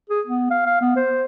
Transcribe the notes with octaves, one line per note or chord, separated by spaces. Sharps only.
G#4
B3
F5
F5
B3
C5